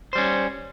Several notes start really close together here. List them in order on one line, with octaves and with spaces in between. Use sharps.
C5 G3 C#4